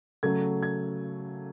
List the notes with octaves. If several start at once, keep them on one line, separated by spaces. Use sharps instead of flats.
C#3 F#3 A3 G#6
G#6